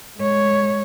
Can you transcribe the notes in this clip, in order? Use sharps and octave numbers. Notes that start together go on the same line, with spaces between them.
G#3 C#5